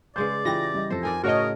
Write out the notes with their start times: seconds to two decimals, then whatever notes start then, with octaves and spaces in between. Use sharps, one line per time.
0.16 C#3 G#3 B4 C5 D5 G6
0.45 E3 F4 G4 G5 A#6
0.74 G3 D#5
0.90 F2 A4 C5
1.03 D#4 A#4 D5 G#5
1.23 A2 C#3 F#4 A#4 C#5 D#5 A5